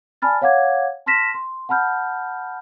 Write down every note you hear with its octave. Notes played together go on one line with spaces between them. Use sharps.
D5 G#5 A5 B5 F6 A6
C#5 F5 F#5 D6 G#6
A5 C6 F6 A#6 B6 E7
C6
F#5 A5 B5 F6 G6